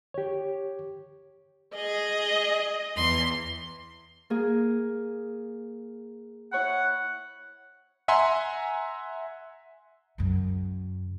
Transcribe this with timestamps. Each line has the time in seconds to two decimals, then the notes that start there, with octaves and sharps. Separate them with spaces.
0.14 G4 C#5
1.74 G#4 D#5
2.95 E2 C6
4.30 A#3 G#4
6.53 E4 C#5 F#5 B5
8.08 E5 F#5 G#5 A#5 C6
10.18 F#2 C#3